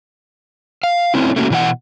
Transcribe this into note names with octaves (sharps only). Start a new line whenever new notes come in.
F5
A3 C4 C#4 E4
A3 A#3 C#4 F#4
B2 E3 E4 D#5 F#5